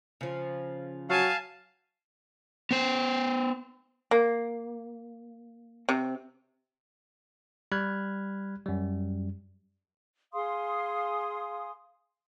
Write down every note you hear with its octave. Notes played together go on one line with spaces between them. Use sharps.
C#3 F3
F#3 F5 G#5 A5
B3 C5
A#3
C3
G3 B5 F6 F#6 G#6
F#2 G3
G#4 F5 C6 D#6